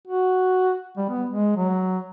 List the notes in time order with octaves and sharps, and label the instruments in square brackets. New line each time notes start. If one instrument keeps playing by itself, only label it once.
[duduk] F#4
G3
B3
G#3
F#3